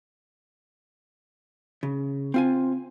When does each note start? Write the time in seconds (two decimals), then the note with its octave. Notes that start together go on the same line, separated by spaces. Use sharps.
1.83 C#3
2.34 C4 F4 G#5